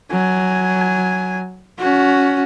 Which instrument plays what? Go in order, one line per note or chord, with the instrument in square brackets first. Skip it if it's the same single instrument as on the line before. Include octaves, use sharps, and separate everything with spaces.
[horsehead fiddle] F#3 G#5
C#4 F#4